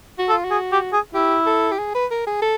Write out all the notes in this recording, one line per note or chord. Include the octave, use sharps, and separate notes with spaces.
F#4
A4
F4
F#4
G#4
G4
G#4
E4 G4
A4
G4
G#4
B4
A#4
G#4
A4